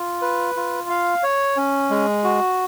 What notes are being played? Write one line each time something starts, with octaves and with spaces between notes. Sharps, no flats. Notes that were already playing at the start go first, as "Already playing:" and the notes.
Already playing: F4
B4
F4
F5
C#5
C#4
G#3
F#4